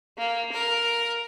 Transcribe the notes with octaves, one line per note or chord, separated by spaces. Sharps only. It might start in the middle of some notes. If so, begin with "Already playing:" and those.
A#3
A#4